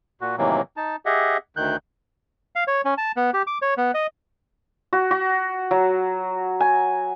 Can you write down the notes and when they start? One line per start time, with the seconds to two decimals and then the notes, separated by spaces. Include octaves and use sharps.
0.21 A#2 F#4
0.38 A2 C3 D#3 E3 F#3 A#3
0.77 D#4 A5
1.06 G4 G#4 D#5 E5 F#5
1.57 D2 D#3 F#6 G6
2.56 F5
2.68 C#5
2.85 C#4
2.98 A5
3.17 B3
3.34 G4
3.47 D6
3.62 C#5
3.77 B3
3.94 D#5
4.93 F#4
5.11 F#4
5.71 F#3
6.60 G#5